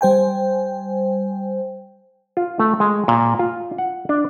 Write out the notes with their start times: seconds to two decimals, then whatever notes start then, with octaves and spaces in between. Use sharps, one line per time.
0.01 G3 C5 G5 G#5
2.37 F4
2.59 A3
2.80 G#3
3.08 A#2
3.39 F4
3.78 F#5
4.09 D4